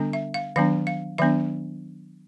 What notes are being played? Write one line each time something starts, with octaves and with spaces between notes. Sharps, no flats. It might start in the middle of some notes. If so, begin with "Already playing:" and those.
Already playing: D3 G3 B3 D4
E5
F5
D#3 F#3 B3 D4 F5
F5
D#3 F#3 B3 D4 E5